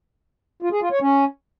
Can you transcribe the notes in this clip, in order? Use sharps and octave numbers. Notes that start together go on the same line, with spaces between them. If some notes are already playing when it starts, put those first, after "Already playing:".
F4
G#4
F4
C#5
C#4